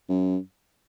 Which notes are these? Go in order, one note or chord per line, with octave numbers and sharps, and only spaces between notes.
F#2